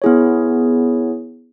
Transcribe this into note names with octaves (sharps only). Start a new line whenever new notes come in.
B3 E4 G#4 C#5